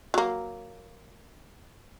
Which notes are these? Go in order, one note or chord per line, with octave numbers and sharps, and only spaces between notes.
F#3 A#3